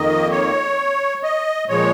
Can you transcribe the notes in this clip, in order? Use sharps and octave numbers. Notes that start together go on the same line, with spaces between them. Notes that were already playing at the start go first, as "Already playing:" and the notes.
Already playing: F2 D#3 A#3 D#5
C#5
D#5
A#2 F3 G#3 C#5